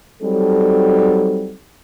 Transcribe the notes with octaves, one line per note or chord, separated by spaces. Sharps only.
F#3 G3 C4 D#4 A4